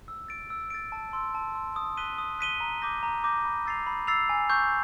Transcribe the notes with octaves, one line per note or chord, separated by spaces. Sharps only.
E6
A6 D7
E6
A6 D7
A5
C6 E6
A5
C6 E6
D#6
F#6 B6 D#7 G7
D#6
F#6 B6 D#7 G7
A#5
D6 G6 A#6
A#5
D6 G6 A#6
B5
E6 A6 C7 F7
B5
E6 A6 C7 F7
G#5
C#6 E6 G6